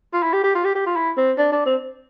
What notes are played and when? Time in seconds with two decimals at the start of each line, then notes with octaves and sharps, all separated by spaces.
0.13 F4
0.22 E4
0.33 G4
0.43 G4
0.55 F4
0.65 G4
0.75 G4
0.86 F4
0.96 E4
1.17 C4
1.37 D4
1.52 D4
1.66 C4